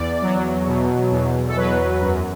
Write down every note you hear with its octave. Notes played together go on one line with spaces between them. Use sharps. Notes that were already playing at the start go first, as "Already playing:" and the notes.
Already playing: E2 D5
F#3
B2
E2
A4
F#3 B4
F#2